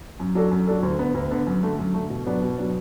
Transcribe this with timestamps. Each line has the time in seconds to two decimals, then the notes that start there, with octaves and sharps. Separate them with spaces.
0.20 F#2
0.35 F#3 D4 A4
0.51 F#2
0.67 F#3 D4 A4
0.83 D2
0.99 D3 B3
1.14 D2
1.31 D3 B3
1.47 F#2
1.63 D3 A3
1.79 F#2
1.94 D3 A3
2.10 B2
2.26 F#3 B3 D4
2.42 B2
2.58 F#3 B3 D4